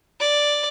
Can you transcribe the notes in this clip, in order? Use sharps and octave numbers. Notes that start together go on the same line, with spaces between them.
D5